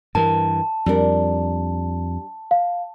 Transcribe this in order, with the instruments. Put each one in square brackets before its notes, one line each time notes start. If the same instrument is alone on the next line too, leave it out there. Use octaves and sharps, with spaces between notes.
[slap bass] G2 E3 [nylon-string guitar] A#4 [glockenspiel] A5
[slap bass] F2 [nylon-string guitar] G3 D4 A#4
[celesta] F5